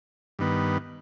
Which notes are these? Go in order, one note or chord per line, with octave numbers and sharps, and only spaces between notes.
G2 D#3 B3